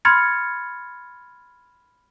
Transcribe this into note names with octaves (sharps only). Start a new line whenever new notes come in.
B5 C6 F6 G#6 A6 C#7